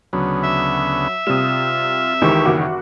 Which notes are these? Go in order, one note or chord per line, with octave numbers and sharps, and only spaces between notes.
D2 C#3 F#3 B3
E5
C3 G3 F4 D#6 E7
C#2 D#3 E3 G4 C5 C#6
F#1 C#3 F#4 D6